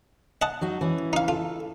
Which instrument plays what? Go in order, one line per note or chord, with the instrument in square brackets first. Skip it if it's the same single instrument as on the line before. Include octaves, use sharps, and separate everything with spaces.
[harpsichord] D#5 F#5 A5
[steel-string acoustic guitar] F#3 D#4 F#4
E3 C#4
[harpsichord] D#4 F5
[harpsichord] F4 [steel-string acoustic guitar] A4